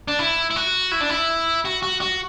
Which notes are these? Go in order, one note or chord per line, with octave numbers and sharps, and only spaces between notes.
D4
E4
E4
F#4
E4
D4
E4
F#4
F#4
F#4